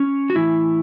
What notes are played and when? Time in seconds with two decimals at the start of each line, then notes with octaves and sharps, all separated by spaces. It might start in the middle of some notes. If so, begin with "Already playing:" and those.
Already playing: C#4
0.30 F#4
0.35 A2 E3 E4